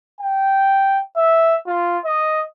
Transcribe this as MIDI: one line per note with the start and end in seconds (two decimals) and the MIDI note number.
0.21 1.02 79
1.17 1.57 76
1.67 1.98 65
2.05 2.42 75